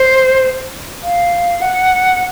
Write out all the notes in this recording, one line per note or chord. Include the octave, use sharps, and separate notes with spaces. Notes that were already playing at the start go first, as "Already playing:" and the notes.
Already playing: C5
F5
F#5